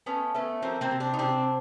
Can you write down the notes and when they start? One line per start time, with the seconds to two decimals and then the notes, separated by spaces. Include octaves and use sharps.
0.06 A3 B3 C#4
0.35 A3 B3 C#4
0.62 F3 A#3 C4
0.81 A#3 C4
0.91 C3
1.00 C4 D4
1.14 D#4
1.19 C3 C4 D4